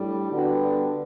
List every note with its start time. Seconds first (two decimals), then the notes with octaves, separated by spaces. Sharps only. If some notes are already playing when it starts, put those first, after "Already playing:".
Already playing: A2 G3 D4
0.32 D3 G3 B3 D4 F#4